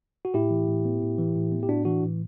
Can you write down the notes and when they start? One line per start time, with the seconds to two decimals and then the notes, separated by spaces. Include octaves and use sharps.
0.25 F#4
0.34 A2 E4 G4
0.50 E3
0.68 A2
0.85 B3
1.02 A2
1.18 E3
1.36 A2
1.52 B3
1.63 G4
1.68 A2 D4 F#4
1.85 E3 D4 F#4
2.03 A2